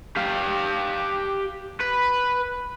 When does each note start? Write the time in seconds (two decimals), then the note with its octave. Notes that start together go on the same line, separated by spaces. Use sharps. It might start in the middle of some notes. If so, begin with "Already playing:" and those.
0.16 G4 F5
1.81 B4